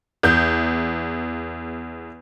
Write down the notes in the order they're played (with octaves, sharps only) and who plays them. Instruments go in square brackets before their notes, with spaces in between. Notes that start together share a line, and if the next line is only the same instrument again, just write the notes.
[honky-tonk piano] E2 G6